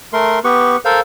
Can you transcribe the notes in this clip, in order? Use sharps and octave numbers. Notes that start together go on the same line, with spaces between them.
A3 A#4 C6
B3 G4 B4 C#6
A4 A#4 C5 F5